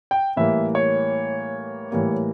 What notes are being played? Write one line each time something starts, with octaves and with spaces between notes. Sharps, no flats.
G5
A2 E3 G3 A#3 E5
C#5
A2 E3 G3 A#3